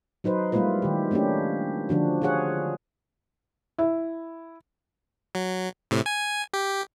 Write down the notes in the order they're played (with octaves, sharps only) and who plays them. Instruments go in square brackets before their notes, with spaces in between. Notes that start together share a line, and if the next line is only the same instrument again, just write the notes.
[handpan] F#3 D#4 B4 C5
G3 G#3 A#3 E4 F4 B4
D#3 G4
A3 A#3 C#4 D4 G4
D3 F3 D4 F#4
F4 G4 G#4 C#5 F#5
[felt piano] E4
[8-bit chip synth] F#3
A2 C3
G#5
G4